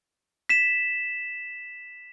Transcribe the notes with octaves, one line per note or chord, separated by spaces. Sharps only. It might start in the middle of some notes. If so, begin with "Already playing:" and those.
B6 E7